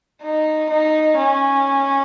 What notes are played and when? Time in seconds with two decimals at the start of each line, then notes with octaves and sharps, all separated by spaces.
0.22 D#4
0.70 D#4
1.17 C#4